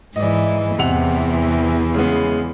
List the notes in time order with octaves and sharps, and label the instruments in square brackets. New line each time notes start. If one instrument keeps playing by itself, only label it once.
[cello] G#2 E3 [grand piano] D5 D#5
[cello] E2 E3 [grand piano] C3 F#5 F7
[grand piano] C#3 G#3 B3